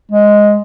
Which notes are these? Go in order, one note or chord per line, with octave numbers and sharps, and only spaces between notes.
G#3